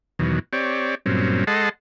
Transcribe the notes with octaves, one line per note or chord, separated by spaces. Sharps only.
E2 B2 D#3 F#3
C4 G4 C#5 D5
G2 A#2 F#3 C4 C#4
G#3 A4 D#5 F#5 A5 C6